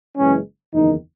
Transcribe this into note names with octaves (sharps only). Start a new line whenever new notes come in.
F#1 F#2 E3 G#3 C#4
F#1 E2 D#3 D#4